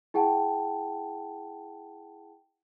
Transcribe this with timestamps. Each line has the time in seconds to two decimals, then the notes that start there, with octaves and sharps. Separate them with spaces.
0.14 E4 G#4 F#5 G5 A5